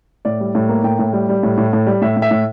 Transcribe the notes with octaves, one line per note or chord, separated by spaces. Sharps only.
A2 D5
G3
A2
A#3
A2 G5
A2
G3
G3
A2
A2
A2
G3
A2 E5
A2
E5
A2